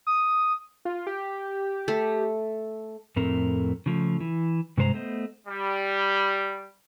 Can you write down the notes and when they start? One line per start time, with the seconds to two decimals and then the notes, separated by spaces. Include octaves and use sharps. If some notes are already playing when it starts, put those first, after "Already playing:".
0.07 D#6
0.85 F4
1.07 G4
1.88 A3
3.16 F2 A2 A3 C4 A#4
3.86 C#3 F3 A3
4.20 E3
4.78 G2 C3 G#3 C5 A#5
4.94 A3 B3 C5 D#5
5.47 G3